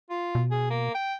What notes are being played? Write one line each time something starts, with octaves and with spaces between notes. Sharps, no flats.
F4
B2
G#4
A#3
G5